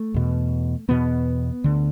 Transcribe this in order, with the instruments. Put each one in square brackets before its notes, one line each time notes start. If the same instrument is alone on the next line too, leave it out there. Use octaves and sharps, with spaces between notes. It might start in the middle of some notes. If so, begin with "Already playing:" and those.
Already playing: [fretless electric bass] A3
E2 B2
E2 B2 B3
D2 D3